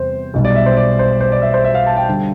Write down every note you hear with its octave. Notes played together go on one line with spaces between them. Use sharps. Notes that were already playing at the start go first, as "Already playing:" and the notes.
Already playing: E2 C3 G3 C5
B1 B2 G3
D5
E5
C5
D5
C5
C5
D5
E5
C5
E5
F5
A5
G5
D3 G3